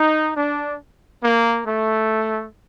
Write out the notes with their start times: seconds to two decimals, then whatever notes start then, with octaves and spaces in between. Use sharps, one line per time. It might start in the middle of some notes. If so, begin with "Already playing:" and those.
Already playing: D#4
0.37 D4
1.24 A#3
1.67 A3